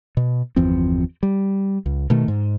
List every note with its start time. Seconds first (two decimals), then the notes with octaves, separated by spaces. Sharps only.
0.17 B2
0.56 G1 E2 F3 C4
1.23 G3
1.86 C#2
2.10 B2 D#3 A3
2.28 G#2